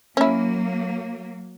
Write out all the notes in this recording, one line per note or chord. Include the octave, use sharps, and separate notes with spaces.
F#3 A#3 C#4 E4